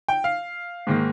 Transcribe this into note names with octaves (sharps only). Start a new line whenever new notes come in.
G5
F5
G#2 D#3 A#3